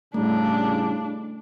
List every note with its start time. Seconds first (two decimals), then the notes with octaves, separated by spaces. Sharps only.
0.14 A2 C#3 G3 A3 D4